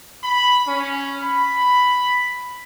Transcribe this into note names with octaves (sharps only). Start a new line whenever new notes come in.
B5
C#4
B5